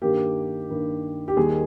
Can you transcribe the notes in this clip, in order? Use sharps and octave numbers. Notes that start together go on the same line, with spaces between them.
G2 D#3 A#3 G4
G2 D#3 A#3
G4
D#2 D#3 G3 G#4